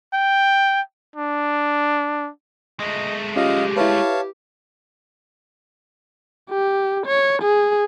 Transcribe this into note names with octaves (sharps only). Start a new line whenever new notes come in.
G5
D4
G#3 A3 D#5
C#4 F4 G4 D#5 F5 A#6
E4 B4 C#5 F5 A5
G4
C#5
G#4